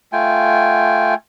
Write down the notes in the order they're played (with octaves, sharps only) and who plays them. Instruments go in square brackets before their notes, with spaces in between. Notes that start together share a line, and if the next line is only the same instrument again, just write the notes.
[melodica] A3 F4 G5 G#5